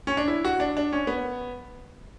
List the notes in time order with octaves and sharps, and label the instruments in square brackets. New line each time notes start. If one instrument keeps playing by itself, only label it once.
[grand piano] C#4
D4
E4
F#4
D4
D4
C#4
B3